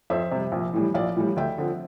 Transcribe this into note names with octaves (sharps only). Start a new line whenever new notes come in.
F2 C5 E5
C3 G3
A#1
A2 E3 G3
A#1 D5 F5
A2 E3 G3
D2 E5 G5
D3 F3 C4